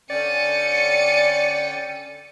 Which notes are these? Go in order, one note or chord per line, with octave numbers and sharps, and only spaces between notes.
D3 C#4 D5 G5 C#7 D#7